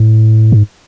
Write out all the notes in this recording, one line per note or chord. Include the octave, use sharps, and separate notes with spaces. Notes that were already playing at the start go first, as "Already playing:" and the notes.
Already playing: A2
G#2